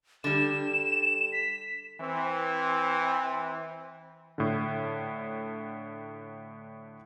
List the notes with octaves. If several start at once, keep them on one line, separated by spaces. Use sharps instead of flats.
D3 G3 E7
B6
E3 C4
A2 D3